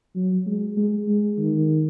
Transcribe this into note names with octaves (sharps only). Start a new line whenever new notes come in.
F#3
G#3
G#3
G#3
D#3